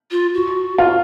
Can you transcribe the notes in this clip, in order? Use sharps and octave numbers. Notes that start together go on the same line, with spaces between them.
F4
F#4
F4